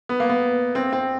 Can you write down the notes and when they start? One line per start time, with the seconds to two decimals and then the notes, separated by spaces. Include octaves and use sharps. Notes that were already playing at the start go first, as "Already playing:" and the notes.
0.09 B3
0.20 A#3
0.29 B3
0.75 C4
0.93 C4